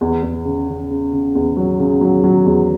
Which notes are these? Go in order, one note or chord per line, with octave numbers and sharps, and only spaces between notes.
E2
E2
C#3
C#3
C#3
C#3
E2
F#3
C#3
F#3
F#3
E2